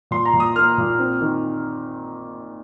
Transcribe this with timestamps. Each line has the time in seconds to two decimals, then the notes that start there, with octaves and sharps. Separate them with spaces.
0.11 A#2 C6
0.25 A#5
0.34 A#2
0.40 D#6
0.56 A#3 F6
0.78 A#2
0.99 C4
1.21 D#3